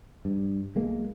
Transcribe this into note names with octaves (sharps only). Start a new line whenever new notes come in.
G2
B1 G#3 A#3